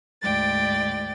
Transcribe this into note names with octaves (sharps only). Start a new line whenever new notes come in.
D2 G#2 D5 G5 A6